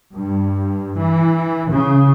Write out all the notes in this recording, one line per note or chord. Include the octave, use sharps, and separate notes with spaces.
G2
E3
C#3